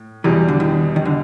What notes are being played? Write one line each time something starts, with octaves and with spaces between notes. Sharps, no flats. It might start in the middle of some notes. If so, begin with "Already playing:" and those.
Already playing: A2
E2 B2 E3 G3
D3
D#3
D#3
D3